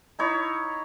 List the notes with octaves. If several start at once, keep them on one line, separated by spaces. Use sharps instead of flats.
D#4 E4 C#5